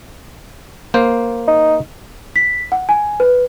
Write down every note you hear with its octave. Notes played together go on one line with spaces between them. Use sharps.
A#3 C5
D#4
B6
F#5
G#5
B4